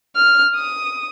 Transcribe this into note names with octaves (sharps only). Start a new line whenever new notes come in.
F6
D#6